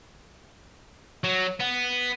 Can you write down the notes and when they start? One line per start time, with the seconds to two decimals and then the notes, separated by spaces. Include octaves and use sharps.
1.24 F#3
1.60 B3